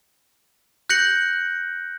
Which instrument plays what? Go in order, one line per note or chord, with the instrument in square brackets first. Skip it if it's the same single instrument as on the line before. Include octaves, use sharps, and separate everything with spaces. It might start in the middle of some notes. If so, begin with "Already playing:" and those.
[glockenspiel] F#6 G6 A#6 C#7 F#7